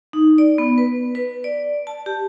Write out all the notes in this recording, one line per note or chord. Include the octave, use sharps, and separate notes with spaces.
D#4
D5
B3
B4
B4
D5
A5
G4